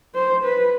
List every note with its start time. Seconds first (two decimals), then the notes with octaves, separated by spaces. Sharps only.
0.15 C5
0.45 B4